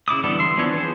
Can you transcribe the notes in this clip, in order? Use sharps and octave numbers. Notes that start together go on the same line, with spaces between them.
C#3 E4 D6 D#6
D3 E3 G3 B3 A4
E5 C6
E3 F3 B3 D4 C#5
B3 G#4 C5